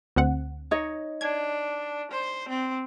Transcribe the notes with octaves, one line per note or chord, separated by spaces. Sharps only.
D2 C4 F#5
D#4 C#5 D#5
D4 G#6
C5
C4